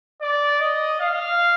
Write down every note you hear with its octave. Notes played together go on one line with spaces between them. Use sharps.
D5
D#5
F5